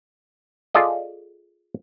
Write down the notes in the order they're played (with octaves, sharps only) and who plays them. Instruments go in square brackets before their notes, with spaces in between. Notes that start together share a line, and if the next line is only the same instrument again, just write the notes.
[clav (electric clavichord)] F4 G#4 A4 D5 D#5